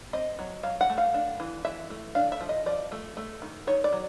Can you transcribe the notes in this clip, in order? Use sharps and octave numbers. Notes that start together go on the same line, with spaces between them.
C4 D#5
F#3
F#3 F5
F#5
A3
F5
D4
E3
E3 E5
A3
D4 F5
E5
F3
D#5
F3 D5
A3
A3
D#3
D#3 C#5
D5
F#3